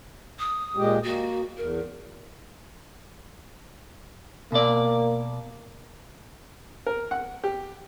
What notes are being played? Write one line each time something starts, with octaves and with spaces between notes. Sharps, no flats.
D#6
A#2 G#3 G4
A#3 F#4
E2 A#4
B2 A#3 D5
A#4
F#5
G4